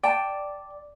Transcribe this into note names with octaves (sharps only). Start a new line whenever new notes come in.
D5 G5 A5